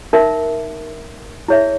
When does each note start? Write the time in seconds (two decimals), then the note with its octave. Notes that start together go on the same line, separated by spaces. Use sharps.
0.13 D#4 A#4 E5
1.48 E4 G#4 C#5 E5